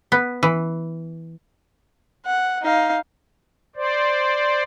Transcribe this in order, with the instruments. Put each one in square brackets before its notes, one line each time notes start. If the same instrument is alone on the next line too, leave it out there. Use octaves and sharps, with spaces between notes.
[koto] B3
E3
[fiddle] F#5
D#4 F5
[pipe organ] C5 D5